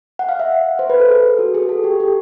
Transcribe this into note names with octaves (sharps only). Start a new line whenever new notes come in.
F#5
F5
E5
C5
B4
A4
G#4
F#4
G#4
A4
G4
G4